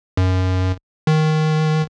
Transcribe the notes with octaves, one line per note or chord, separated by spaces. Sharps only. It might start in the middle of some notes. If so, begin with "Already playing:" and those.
F#2
D#3